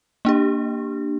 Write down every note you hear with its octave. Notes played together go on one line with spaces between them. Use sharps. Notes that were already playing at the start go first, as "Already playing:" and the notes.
A#3 D4 G4